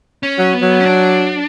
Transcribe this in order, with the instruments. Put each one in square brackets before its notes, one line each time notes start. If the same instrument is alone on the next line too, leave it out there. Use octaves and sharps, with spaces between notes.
[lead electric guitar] C#4
[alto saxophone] F#3
[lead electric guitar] B3
[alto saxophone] F#3
[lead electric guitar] C#4
D4